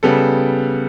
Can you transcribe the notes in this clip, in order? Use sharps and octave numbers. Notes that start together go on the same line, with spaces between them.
C#3 G3 B3 A4